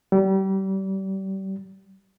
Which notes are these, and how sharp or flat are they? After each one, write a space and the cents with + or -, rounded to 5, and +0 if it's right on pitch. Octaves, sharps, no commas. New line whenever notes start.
G3 -30